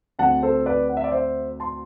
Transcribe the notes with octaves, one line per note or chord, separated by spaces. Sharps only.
D2 D3 A3 C4 F#5 A5
A4 C5
B4 D5
F#5
E5
D5
C5 E5
A5 C6